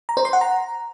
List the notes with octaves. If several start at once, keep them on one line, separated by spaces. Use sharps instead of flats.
A#5
C5
C6
F#5
A#5